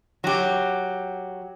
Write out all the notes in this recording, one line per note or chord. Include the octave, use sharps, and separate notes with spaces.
F#3 G4